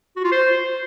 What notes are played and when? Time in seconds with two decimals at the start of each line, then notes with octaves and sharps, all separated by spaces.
0.16 F#4
0.24 F4
0.32 C5